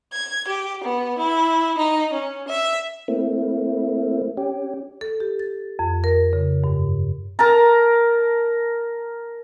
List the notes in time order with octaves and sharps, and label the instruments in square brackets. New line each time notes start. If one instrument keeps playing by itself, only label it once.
[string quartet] G#6
G4
B3
E4
D#4
C#4
E5
[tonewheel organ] A3 A#3 C4 E4
C#4 G4
[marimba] A4
G4
A6
F2
A#4
C#3
G2
[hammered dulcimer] A#4 A5 A#5